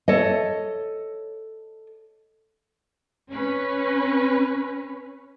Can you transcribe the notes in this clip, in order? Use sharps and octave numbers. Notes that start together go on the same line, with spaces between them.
A4 C#5 D#5
C#4 B4